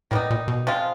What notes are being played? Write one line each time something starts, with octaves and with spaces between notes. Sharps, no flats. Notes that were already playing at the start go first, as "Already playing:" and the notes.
A2 D#3 G3 B3 D#4
A#2
B2
F3 G#3 C4 F4